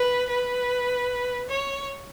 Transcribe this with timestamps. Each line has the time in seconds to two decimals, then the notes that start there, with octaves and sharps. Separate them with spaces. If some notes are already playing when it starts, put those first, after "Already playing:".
Already playing: B4
0.29 B4
1.49 C#5